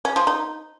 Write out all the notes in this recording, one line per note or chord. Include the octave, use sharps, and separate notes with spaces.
C#4
F3
D#4